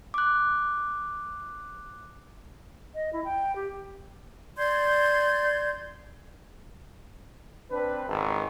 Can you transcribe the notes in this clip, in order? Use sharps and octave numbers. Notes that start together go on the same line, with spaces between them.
D6 F#6
D#5
E4
G5
G4
D5 C6 G6 G#6
C4 D4 B4
G#1 C#2